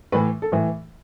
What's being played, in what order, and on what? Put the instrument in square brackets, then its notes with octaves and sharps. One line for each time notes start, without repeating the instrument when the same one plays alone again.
[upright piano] A2 E3 B4
A4
A2 E3